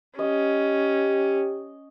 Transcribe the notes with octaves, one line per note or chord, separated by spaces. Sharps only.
C#4 G4 D#5